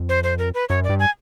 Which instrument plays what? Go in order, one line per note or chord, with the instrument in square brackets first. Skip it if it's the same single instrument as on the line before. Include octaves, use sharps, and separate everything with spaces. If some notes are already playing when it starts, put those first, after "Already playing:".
Already playing: [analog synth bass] F2
[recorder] C5
C5
A#4
B4
[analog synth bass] F#2 [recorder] C#5
[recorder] D5
[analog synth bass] G2
[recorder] G#5